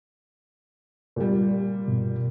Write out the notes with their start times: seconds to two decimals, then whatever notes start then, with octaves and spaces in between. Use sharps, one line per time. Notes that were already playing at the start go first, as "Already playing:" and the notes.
1.16 A#2 G3
1.88 G2 B2